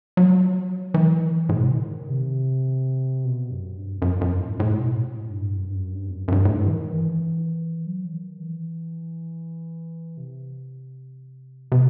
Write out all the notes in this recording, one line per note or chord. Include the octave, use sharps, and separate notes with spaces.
F#3
E3
A2
B2
C3
D#3
C3
B2
F#2
G2
E2
F#2
F#2
A2
A2
B2
A2
G2
F#2
G2
F#2
G2
E2
F#2
F#2
G2
A2
G2
E3
D#3
E3
F#3
E3
D#3
E3
C3
C3